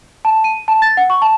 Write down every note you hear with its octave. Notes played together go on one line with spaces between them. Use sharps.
A5
D#7
A5
A6
F#5
C#6
A5